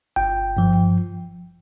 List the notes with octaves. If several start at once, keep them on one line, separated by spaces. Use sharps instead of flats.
G1 G5
G2 F3